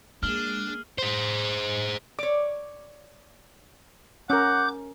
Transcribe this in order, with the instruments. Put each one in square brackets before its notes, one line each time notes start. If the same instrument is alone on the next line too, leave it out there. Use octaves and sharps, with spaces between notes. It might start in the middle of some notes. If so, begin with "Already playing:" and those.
[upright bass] G#3 [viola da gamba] A#3 G#4 [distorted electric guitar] D4 [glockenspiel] F6 G7
[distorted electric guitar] G#4 C5
[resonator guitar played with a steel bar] C#5 D5 [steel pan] D6
[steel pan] C#4 A#4 [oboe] F#5 [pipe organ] D6 G6